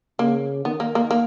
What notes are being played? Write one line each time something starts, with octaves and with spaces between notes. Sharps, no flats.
C#3 A#3
D#3 B3
A#3
A#3
A#3